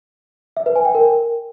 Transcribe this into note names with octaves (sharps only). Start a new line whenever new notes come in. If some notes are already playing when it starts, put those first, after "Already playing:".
E5
B4
G#5
G5
A#4